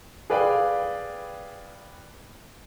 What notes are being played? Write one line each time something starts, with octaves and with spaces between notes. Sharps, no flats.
G#4 B4 D5 F5 G5